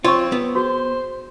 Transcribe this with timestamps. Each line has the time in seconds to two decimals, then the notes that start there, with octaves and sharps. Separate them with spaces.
0.04 C4 F4 C#5 C6 C#6
0.32 B3
0.55 F#4 G#4 C5